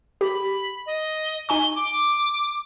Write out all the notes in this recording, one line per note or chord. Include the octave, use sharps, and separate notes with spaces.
G4 B5
D#5
D#4 G#5 C#6 G7
D6